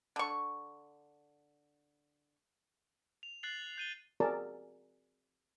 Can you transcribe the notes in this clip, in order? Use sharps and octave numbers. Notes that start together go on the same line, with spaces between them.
D3 C#6
F7
F#6 A6 C7 F#7
G6 D#7 G7
C4 F#4 G#4 A#4 D5 A5